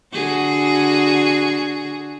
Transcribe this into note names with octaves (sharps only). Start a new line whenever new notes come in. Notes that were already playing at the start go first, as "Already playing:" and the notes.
D3 F#4 G#4